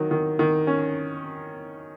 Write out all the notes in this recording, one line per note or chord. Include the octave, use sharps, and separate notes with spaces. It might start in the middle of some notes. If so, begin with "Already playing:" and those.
Already playing: D#3 F#3
D#3
D#3
C#4